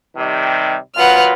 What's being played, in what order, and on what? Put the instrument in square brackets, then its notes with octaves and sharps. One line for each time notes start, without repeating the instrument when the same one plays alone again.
[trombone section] C3 D#3 G3
[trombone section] A#2 F#3 F4 [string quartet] B4 F#5 F6